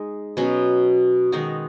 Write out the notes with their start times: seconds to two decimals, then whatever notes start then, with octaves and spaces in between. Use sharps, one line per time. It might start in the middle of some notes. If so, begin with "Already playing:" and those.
Already playing: G#3 D#4 G#4
0.37 B2 F#3 C#4
1.32 D#3 G#3 D#4 F#4